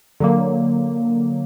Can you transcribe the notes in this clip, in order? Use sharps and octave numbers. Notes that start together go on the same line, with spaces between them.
D3 F#3 A#3